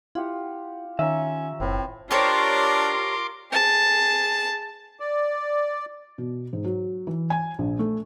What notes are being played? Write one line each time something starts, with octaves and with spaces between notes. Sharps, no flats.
E4 F4 G4 F#5
D#3 C#4 C#5 E5 A#5
F#1 A2 C4 B4
D4 F4 G4 A#4 C5 C#5 C6 D6
G#4 A5
D5
B2
G#2
F#3
E3
G#5
A#1
A3